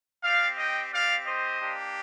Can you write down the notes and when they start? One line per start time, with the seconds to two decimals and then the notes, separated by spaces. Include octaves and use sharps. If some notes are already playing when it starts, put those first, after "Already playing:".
0.23 C4 G4 D5 F5
0.58 D#5 G5
0.92 C4 G4 D5 F5
1.26 C5 D#5
1.60 A#3 D4 G4